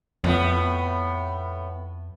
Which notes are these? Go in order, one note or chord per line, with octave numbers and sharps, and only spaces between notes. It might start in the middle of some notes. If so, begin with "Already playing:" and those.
F2 A2 B3